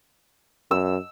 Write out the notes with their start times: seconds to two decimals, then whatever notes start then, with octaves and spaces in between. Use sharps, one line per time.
0.71 F#2 E6